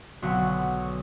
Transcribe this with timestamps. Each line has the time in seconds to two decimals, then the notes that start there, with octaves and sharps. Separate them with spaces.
0.22 B1 D3 F#4